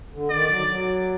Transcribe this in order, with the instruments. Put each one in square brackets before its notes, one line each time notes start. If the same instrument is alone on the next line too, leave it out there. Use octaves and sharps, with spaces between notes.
[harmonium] D3
[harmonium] D#3 [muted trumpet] D5
[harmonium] F#3
F#3